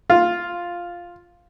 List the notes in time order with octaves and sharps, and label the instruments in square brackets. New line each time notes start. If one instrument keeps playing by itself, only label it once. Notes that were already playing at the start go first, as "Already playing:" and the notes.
[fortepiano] F4